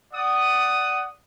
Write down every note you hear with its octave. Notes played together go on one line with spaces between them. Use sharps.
D5 F#5 D#6